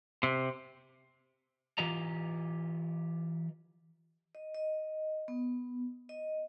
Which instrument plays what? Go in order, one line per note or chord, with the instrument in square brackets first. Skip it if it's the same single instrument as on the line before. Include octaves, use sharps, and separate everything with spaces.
[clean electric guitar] C3
[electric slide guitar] E3 F4 G4 D#5 A#5
[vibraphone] D#5
D#5
B3
D#5